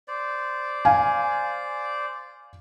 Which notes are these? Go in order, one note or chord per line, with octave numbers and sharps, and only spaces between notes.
C5 D5
F5 G#5